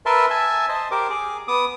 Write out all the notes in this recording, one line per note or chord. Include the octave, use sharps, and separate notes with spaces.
A#4 B4 E5 A5 C6
E5 G#5 A5
C5 D#5 A5
G4 A#4 C5 D6
G#4 D6
B3 D6 D#6